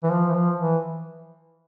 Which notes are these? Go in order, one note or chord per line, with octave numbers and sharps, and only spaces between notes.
E3
F3
E3
F3
E3